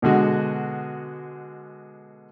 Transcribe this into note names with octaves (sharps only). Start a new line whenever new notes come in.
B2 D3 G#3 F#4